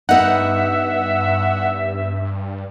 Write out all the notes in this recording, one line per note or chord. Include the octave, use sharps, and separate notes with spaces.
G2 B3 D#4 E5 F#5